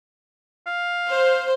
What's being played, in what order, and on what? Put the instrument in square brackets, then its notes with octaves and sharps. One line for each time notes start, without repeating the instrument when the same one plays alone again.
[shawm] F5
[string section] C5